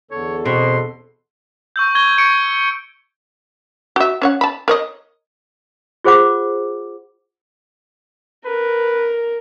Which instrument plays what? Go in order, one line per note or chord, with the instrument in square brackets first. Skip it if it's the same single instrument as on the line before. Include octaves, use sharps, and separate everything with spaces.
[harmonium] E2 D3 A4 [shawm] C#5
[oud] B2 [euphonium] C4 [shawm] C6
[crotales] C#6 E6 G6
C#6 G#6 G7
C#6 C#7 D7
[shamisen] F#4 E5
C#4 C#5 F#5
A5 B5
A#4 C#5 D#5
[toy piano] F4 G#4 C5 F#5 D6
[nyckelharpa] A#4 [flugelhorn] B4